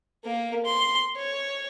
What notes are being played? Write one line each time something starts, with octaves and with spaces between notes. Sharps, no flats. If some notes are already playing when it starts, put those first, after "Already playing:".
A#3 A#4
C6
C#5